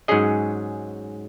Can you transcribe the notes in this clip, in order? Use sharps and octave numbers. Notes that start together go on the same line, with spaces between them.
G#2 F#3 C#4 G#4 D#5